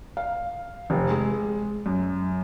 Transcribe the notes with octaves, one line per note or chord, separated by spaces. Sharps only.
F5
F1
G#3
F#2